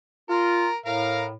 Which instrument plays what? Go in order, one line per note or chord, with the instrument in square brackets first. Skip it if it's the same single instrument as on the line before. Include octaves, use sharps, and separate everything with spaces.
[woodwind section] F4 [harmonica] A#4
[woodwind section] A2 [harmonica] A#4 F5 A#5